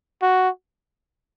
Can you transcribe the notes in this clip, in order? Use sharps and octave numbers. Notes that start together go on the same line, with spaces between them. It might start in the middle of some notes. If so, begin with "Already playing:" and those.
F#4